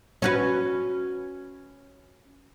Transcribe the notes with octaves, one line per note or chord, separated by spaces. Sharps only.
C#4 F#4 B4